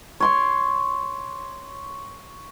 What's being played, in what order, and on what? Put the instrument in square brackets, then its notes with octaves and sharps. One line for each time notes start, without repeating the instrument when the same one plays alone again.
[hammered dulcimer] C#5 C6 D6